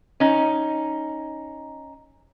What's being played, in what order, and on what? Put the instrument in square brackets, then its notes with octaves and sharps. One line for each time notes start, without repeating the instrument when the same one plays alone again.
[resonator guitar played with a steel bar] C#4 D#4